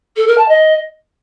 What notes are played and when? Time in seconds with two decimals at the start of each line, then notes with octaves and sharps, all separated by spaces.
0.16 A4
0.27 A#4
0.37 A5
0.48 D#5